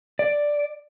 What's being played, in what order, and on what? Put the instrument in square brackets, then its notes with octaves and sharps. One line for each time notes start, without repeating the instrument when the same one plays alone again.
[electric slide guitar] D5